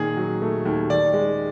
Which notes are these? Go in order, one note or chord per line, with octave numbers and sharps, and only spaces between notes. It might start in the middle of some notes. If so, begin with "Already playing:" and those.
Already playing: A#2 D#3 G#4
F#3
A3
D#2
D#3 D5
G#3